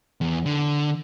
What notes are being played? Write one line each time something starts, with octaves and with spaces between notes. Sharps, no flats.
E2
D3